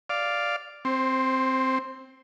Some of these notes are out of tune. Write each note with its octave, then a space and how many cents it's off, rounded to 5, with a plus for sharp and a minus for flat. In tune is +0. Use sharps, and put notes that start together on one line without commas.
D5 +0 F5 +0
C4 +0 C5 +25